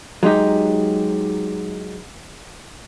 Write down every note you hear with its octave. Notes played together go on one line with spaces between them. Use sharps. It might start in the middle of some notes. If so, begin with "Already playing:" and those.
F#3 G#3 D#4 G4